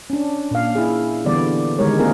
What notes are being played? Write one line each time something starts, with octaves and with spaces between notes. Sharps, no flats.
C#4 D4
A#2 F5
E4 G#4
D3 E3 G3 B3 D5
D3 D#3 G3 G#3 A#4 C#5
A#3 C4 F4 G#4 A#4